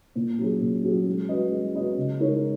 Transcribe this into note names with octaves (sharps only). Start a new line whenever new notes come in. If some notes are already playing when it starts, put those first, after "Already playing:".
A#2
F#3 C#4 G#4
A#2
F#3 C#4 G#4
G#3
C#4 F#4 B4 D#5
G#3
C#4 F#4 B4 D#5
C#3
G#3 D#4 A#4 C#5